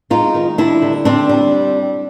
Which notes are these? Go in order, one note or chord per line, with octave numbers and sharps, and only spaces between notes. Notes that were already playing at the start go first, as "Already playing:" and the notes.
G#3 D#4 F4
D#3
G3 D4 E4
D3
G3 C4 D4
G3